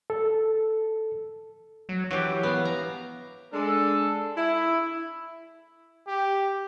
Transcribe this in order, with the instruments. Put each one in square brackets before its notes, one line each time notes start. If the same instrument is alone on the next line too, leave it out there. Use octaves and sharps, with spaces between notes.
[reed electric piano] A4
[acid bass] F#3
[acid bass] E3 [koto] F#3 G4
[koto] B3 F5
A#5
[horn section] G#3 D4 A4
E4
[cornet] G4